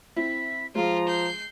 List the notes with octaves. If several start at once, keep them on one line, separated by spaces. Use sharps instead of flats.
C4 E4 B6
F3 G#3 F4 A#5
G6 C7